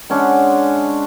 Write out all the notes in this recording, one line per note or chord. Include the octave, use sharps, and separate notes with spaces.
G#3 C#4 D4 F#5